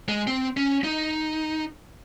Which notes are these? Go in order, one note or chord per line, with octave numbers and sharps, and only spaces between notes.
G#3
C4
C#4
D#4